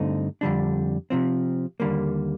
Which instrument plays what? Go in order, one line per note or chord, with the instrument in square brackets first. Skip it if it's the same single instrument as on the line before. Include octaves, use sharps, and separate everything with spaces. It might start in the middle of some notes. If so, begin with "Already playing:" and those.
Already playing: [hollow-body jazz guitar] G2 D3 A3 C4 D#4
F2 D3 G3 D4
C3 F3 C4
D#2 D3 G3 A#3